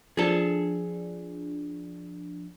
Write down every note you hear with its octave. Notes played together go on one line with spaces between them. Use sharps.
F3 D4 G#4 A4